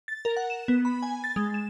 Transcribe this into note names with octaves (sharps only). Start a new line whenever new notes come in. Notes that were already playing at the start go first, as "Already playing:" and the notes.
A6
A#4
F#5
E7
B3
B5
G#5
A6
G#3
E7